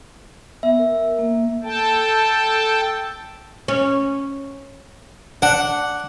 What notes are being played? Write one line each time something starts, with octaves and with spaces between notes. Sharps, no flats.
B3 E5
A#4
A#3
A4 G5 A5
C#4
D4 F#5